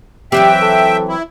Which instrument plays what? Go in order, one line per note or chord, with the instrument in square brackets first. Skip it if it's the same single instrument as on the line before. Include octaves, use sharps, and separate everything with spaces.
[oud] E3 F#3 C4 [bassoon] G4 [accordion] E5 G5
[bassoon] A4
[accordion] E4